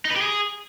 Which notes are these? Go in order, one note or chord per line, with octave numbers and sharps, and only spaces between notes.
D#4
B4
G4
G#4